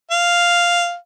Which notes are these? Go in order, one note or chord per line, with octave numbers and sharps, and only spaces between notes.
F5